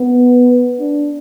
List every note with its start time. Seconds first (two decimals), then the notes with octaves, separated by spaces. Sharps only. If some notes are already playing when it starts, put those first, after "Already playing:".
Already playing: B3
0.80 D4